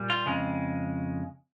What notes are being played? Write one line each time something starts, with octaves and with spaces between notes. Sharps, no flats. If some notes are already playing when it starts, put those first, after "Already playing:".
Already playing: A#2 G3
F4
F2 C#3 G#3